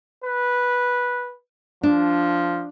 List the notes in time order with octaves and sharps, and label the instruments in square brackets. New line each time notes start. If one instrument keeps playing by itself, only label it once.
[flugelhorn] B4
[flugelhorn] F3 [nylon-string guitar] D4